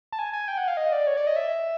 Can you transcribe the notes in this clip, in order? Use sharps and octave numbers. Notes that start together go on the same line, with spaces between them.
A5
G#5
G#5
G5
F#5
F5
D#5
D5
C#5
D5
D#5
E5